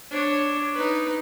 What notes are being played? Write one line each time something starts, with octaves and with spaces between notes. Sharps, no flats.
D4 C#5
D#4 B4